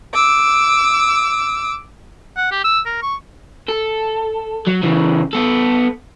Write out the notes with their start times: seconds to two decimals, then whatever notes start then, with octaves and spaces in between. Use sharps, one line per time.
0.14 D6 E6
2.36 F#5
2.52 G4
2.64 E6
2.86 A#4
3.03 C#6
3.68 A4
4.67 F#3
4.83 C#3 E3
5.33 B3 A4